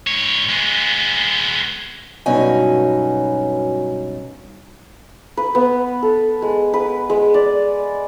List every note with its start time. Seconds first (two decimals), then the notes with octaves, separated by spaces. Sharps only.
0.07 G#2 C#5
0.49 G#3 B3
2.26 G2 B2 F#3 C#4 D#4 G#5
5.37 B4
5.55 B3
6.02 A4
6.42 G#3
6.74 B4
7.10 G#3
7.34 D5